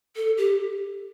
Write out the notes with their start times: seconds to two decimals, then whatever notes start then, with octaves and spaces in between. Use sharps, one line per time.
0.16 A4
0.37 G4